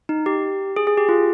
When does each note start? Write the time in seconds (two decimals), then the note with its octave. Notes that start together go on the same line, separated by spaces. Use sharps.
0.09 D#4
0.26 G4
0.76 G#4
0.87 G#4
0.98 G4
1.09 F4